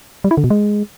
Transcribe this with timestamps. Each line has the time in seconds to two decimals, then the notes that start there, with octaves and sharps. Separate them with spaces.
0.24 G3
0.31 E4
0.37 D3
0.44 B2
0.50 G#3